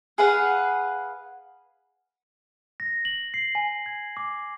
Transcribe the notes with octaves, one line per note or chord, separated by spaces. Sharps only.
G#4 B4 F5 F#5
A#6
F#7
C7
G#5
G#6
D6